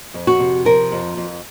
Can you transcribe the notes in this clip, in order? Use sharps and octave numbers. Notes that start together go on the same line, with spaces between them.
F2
F#4
C3
F3 A#4
F2
F2